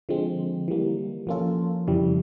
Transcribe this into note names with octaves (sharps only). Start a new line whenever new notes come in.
D3 F3 G#3 C4
E3 G3 A#3
F3 A#3 C#4 F4 A4
F2 C#3 E3 G3